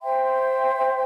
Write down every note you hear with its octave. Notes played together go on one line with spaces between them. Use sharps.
C5 E5 G5 C6